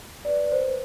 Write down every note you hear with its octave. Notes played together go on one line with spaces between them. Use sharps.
B4 D5
C5
B4